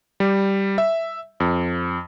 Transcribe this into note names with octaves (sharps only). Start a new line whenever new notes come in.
G3
E5
F2